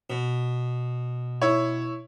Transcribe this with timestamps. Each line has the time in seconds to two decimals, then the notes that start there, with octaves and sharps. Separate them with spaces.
0.10 B2
1.42 E4 C#5